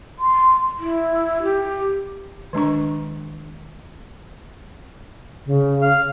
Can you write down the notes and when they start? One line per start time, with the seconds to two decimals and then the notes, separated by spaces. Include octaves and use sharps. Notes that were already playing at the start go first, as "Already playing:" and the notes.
0.19 C6
0.79 E4
1.43 G4
2.53 D#3 G#3 D4 C#6
5.46 C#3
5.82 F5